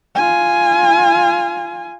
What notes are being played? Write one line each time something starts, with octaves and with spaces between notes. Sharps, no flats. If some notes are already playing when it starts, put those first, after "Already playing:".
F4 G#5